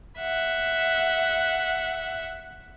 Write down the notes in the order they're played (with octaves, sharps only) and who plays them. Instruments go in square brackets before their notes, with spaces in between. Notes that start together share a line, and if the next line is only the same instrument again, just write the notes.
[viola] E5 F#5